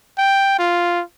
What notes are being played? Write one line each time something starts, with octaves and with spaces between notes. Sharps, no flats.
G5
F4